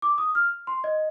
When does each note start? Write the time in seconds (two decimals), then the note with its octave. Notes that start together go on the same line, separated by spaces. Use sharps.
0.02 D6
0.18 D#6
0.35 F6
0.67 C6
0.84 D#5